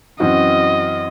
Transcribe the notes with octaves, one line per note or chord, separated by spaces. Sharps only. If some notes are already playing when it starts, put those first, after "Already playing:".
F#2 E3 C4 F#4 D#5